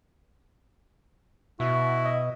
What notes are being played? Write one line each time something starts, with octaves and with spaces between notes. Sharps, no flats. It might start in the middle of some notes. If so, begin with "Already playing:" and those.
B2 E4 F#4
D#5